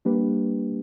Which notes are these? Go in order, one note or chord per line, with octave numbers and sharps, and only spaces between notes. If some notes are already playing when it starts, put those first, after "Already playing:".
G3 A#3 D4 G4 B4